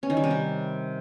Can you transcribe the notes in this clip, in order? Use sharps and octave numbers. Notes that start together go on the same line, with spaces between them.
C#4
D#3
G3
C3
G3